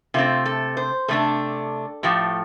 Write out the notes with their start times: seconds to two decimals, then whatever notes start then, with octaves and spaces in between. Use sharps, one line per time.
0.14 C3 A3 C4 F4
0.46 A4
0.77 C5
1.08 C3 A3 D4 A4
2.03 A2 F3 A3 G4